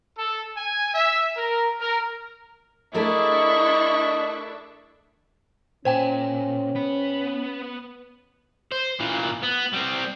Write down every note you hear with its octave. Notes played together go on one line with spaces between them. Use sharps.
A4
G#5
E5
A#4
A#4
A3 D4 E4 G#4 A#4 D#5 E5 C#6
A#2 C#4 C5 G5 G#5
B3 B4
C5
A#2 E3
B3
G3 C4